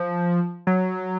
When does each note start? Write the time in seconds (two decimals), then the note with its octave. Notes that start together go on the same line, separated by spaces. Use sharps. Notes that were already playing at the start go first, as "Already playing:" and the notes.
Already playing: F3
0.67 F#3